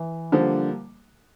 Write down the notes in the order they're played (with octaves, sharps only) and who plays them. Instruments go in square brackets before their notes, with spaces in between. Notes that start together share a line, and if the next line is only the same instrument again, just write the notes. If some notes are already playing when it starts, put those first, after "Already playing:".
Already playing: [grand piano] E3
[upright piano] D3 F3 [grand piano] G3 A#3